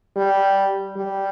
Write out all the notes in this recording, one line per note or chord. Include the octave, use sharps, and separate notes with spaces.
G3
G3